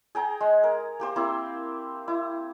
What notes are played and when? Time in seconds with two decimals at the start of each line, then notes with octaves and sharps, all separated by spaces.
0.15 G#4 G5 A#5
0.41 G#3
0.64 A#4
1.00 A#3 G4 C5
1.16 A#3 C4 E4
2.08 E4